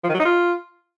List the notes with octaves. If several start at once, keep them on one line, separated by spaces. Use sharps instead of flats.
F3
D#3
F#3
D#4
F4